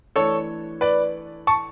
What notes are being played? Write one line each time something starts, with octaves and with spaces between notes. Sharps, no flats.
E3 A3 D4 A4 C#5
B4 D5
A5 C#6